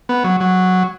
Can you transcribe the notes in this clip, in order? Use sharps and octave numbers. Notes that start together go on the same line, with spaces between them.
B3
F#3
F#3